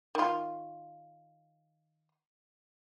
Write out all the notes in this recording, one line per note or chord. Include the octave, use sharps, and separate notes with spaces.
D#3 F4